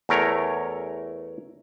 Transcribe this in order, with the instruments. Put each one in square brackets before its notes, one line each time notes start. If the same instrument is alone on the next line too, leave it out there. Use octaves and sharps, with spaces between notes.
[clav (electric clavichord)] E2 A3 A#4 C#5